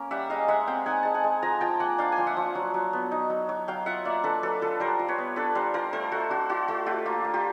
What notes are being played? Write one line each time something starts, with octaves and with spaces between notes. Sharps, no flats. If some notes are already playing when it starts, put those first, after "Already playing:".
Already playing: A#3 C#4 A#4
G3 E5 F#5
G#3 D#5 F5
G#3 E5 F#5
C4 F5 G5
D#4 F#5 G#5
G#3 A5
F#5 G#5
G#3
F3 G#5 A#5
F3 G5 A5
A#3 F#5 G#5
D4 F5 G5
G#5
F3 G5
E5 F#5
F3
F#3
F#3
B3
D#4
F#3
F#3
F#3 F5 G5
F4 E5 F#5
A#3 D5 E5
D4 A4 B4
F#3 A4 B4
F4 A4 B4
G3 A#4 C5
F4
B4 C#5
B3
D4 A4 B4
G3 A#4 C5
F4 A#4 C5
A3 A#4 C5
A3 F#4
D4 F#4
F4 F#4
A3 F#4
A3 F4 G4
A#3 F4
A#3
F4 G4